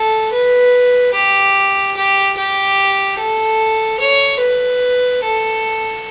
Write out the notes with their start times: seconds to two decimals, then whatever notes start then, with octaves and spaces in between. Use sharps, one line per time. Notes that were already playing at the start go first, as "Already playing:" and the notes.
Already playing: A4
0.33 B4
1.14 G4
1.96 G4
2.37 G4
3.19 A4
4.00 C#5
4.41 B4
5.24 A4